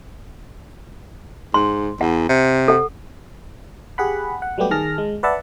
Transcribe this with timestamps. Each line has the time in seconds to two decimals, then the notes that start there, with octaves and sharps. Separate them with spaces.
1.54 G#2 C6
2.01 E2 F#5
2.29 C3
2.68 A4 F#5
3.98 G4 G#4 F#5 B5
4.42 F#5
4.58 F#3 G3 A3 B3 G4
4.71 D#3 G#4 A5 F6 A#6
4.98 G#3
5.23 B4 D5 E5 F#5 A5